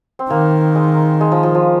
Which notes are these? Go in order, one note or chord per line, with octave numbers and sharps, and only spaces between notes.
C4
D#3 A#3
G#3
G#3
F3
F3
F3